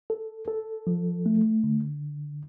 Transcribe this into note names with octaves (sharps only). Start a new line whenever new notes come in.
A4
A4
F3
A3
D3